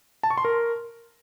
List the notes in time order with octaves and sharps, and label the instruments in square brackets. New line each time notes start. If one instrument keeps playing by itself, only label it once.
[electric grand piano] A5
C#6
C6
A#4